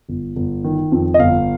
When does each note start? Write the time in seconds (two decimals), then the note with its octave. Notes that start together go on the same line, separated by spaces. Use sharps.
0.09 G1
0.36 G1
0.64 D#3
0.92 F2
1.14 D#5
1.19 G1 F5